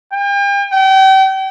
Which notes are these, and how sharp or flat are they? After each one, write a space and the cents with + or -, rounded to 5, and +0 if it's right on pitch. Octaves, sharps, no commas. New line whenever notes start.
G5 +40
G5 -35